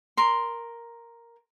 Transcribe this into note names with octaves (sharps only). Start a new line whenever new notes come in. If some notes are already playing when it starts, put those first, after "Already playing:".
A#4 C6